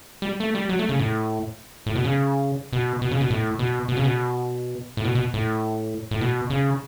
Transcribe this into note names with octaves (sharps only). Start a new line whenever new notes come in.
G3
A3
G3
F#3
A3
C#3
A2
A2
B2
C#3
B2
B2
C#3
B2
A2
B2
B2
C#3
B2
A2
B2
B2
A2
A2
B2
C#3